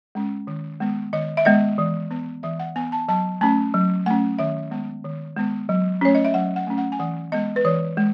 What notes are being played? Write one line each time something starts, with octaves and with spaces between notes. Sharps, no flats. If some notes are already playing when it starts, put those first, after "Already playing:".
G#3 C#4
D#3
G#3 B3
D#3 D#5
E5
G#3 B3 D#5
E3
B3
E3 E5
F#5
B3 G#5
A5
F#3 A5
A3 C#4 A5
F#3
A3 C#4 F#5
D#3 E5
G#3 B3
D#3
G#3 B3
F#3
A3 C#4 C#5
D#5
E5
F#3 F#5
F#5
A3 C#4
F#5
G#5
E3 F#5
G#3 B3 D#5
B4
E3 C#5
G#3